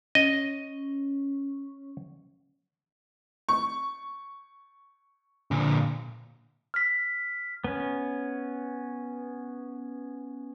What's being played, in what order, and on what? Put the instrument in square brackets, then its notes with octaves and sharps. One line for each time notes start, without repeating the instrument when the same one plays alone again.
[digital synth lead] C#4 [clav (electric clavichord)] D#5
[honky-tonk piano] C#6
[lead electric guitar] A#2 D3
[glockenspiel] F6 B6
[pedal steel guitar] B3 C#4